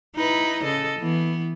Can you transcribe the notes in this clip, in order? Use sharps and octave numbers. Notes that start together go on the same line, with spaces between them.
D#4 E4 B4
C#3 A4 D#5
E3 B3